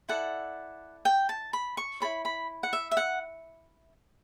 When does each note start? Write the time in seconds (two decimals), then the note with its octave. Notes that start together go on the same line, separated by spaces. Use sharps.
0.09 E4 A4 D5 F#5
1.05 G5
1.29 A5
1.53 B5
1.77 C#6
2.00 E4 A4 C#5 B5
2.25 B5
2.63 F#5
2.73 E5
2.91 E5
2.97 F#5